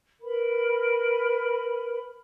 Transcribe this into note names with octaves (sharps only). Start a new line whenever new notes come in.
A#4 B4 B5